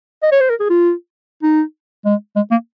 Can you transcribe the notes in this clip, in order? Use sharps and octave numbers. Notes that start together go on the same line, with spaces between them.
D#5
C#5
C5
A#4
G#4
F4
D#4
G#3
G#3
A#3